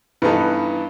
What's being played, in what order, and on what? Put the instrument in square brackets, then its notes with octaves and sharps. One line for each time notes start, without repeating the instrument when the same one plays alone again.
[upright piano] G2 E3 B3 D#4 A4